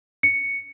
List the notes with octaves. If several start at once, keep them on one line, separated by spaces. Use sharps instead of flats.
C#7